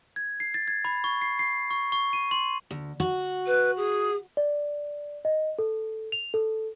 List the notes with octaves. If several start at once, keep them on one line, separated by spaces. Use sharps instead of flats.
G#6
C7
A6
G#6
B5
C#6
C7
C7
C#6
C#6
D#7
C6
D2
F#4
B4
G#4
D5
D#5
A4
F7
A4